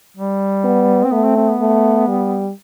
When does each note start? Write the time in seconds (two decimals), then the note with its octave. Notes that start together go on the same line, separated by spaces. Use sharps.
0.17 G3
0.64 B3
1.04 C4
1.12 A3 B3
1.24 C4
1.37 C4
1.49 B3
1.61 A3
2.08 G3